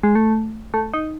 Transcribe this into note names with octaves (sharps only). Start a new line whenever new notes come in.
G#3
A3
A3
D#4